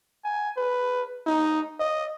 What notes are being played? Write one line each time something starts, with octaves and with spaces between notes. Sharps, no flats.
G#5
B4
D#4
D#5